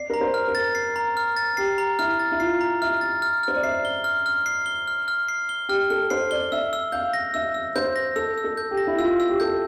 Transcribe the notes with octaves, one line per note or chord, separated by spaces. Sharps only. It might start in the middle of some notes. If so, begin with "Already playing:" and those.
Already playing: D5 C7
A#4 A#5
C5
F6
A#4
A6
C7
A#5
F6
A6
G4 C7
A#5
E4 F6
A6
E4
F4 C7
A#5
E5 F6
A6
F6
C5 F6
D5
E5 C7
G7
F6
F6
C7
G7
F6
F6
C7
G7
G4 F6
A4 F6
C5 C7
D5 G7
E5 E6
E6
F5 G6
A#6
E5 E6
E6
C5 G6
A#6
A4 E6
E6
A4
G6
G4
A#6
E4
F4 E6
E6
G4
A4 G6